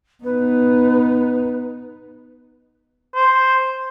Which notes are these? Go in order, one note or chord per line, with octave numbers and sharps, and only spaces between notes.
B3 D#4 B4
C5